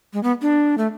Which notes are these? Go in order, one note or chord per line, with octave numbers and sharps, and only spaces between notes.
G#3
B3
D4
A3